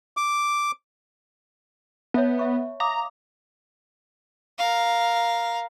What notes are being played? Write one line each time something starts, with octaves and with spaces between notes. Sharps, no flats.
D6
B3 C#5 E5 A5
E5 C#6
F5 A#5 D6 D#6
A#4 F5